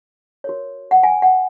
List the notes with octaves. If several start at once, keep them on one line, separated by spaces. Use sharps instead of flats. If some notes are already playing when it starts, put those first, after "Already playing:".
F#4 A#4 C#5
F#5
G#5
F#5